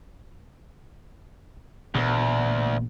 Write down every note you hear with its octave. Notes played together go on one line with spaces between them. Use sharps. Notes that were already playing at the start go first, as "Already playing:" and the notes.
A1 D2 A#2 B3